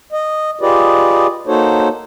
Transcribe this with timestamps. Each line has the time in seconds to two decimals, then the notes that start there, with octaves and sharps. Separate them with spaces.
0.12 D#5
0.61 F4 G4 G#4 B4 D5 D#5
1.47 A#3 D#4 F#4 A4 C5 C#5